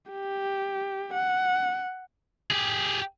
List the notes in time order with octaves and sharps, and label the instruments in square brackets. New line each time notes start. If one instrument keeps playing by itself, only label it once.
[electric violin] G4
F#5
[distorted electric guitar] G4 G#4